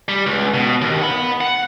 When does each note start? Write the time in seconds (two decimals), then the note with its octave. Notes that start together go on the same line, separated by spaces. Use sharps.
0.09 G3
0.26 C#2
0.54 B2
0.81 D#2
1.02 F#5 B5
1.41 F#5